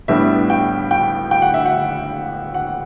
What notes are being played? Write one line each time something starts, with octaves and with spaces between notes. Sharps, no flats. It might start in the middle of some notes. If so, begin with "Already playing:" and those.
A2 G3 B3 D4 E5
G5
G5
G5
F#5
E5
F#5
F#5